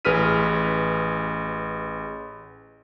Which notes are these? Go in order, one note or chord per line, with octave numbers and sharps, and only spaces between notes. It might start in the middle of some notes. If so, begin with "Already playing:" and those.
A1 G#4 B4 F6 B6 D#7